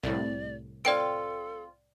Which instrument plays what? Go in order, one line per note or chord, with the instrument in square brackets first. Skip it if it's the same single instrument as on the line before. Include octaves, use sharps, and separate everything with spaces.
[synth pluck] C2 A2 [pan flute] D5
[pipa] C4 F4 [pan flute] A4 [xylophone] D5 G5 D7